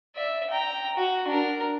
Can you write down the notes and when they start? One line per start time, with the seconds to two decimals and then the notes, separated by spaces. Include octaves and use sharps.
0.15 D5 E5
0.50 G5 A#5
0.96 F#4
1.27 D4 A#4